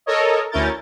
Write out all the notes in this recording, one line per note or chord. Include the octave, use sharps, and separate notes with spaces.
A4 A#4 C#5 D#5
D2 C#4 E4 A#4 G6 A6